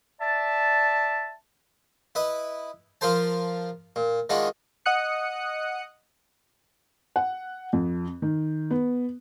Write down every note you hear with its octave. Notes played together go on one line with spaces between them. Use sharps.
D5 E5 A5
E4 B4 D#5
F3 F4 A#4 C5 A5
A#2
D#3 G#3 D4 F4 F#4
D#5 F#5 D#6 F#6 C#7
F#5
F2
D#3
B3